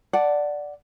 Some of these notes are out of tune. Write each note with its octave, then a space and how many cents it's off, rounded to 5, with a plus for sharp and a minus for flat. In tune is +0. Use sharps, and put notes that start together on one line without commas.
D5 +0 F#5 +0 A5 +5